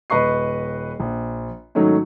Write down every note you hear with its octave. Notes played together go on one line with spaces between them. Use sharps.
D#1 B4 D#5 C#6 C7
A#1
G#2 D#3 F#3 A3 C#4 D#4